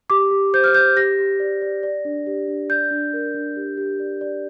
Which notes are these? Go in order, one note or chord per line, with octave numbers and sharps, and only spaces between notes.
G4 D6
G4
C5 G6
F6
C5 G6
G4 A#6
G4
D5
D5
D5
D4
G4
D4
D5 G6
D4
A#4
D4
G4
G4
D5
D5